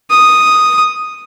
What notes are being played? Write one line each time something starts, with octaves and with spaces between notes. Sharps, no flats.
D#6